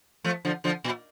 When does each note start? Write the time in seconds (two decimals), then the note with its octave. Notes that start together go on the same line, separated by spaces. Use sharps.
0.24 F3 A3
0.45 D3 F3
0.64 D3 F3
0.84 A#2